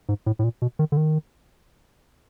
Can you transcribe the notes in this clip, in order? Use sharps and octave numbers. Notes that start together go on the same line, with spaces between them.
G#2
A2
A2
A#2
B2
D#3
D3
D#3